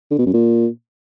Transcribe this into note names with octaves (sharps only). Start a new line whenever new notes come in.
D3
B2
F#2
A#2